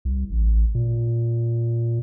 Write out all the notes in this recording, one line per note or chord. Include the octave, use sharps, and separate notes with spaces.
C2
A1
A#2